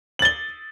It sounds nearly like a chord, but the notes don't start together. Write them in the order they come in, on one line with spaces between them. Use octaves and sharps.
F#7 A6 G7